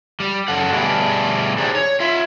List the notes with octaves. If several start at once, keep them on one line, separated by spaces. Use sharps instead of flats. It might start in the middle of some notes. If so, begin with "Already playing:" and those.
G3
F#2 A4 F#5
B2 D3 G3 A3 D4 G#4
D4 D#4 G4 G#4 C5 D5
C#5
F4 E5